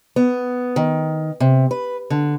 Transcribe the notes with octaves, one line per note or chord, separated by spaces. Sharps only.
B3
D#3
C3
B4
D3